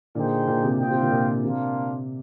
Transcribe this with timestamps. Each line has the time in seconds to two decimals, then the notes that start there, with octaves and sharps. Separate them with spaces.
0.15 A#2 D3 D#4 G#4 C5 G5
0.47 A#2
0.64 C3
0.79 A#2 F4 C5 D#5 G5
0.91 C3
1.00 A#2 D3
1.11 A#2
1.43 C3 A#3 D4 F4